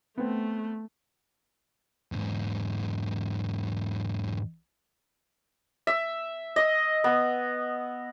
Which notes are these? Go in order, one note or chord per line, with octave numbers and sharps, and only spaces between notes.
A3 B3 C4
E2 G#2
E5
D#5
B3